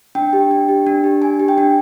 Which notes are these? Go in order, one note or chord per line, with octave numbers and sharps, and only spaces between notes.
D4 G5
G4
D4
G4
D4
G4
D4 G#5
G4
G5
D4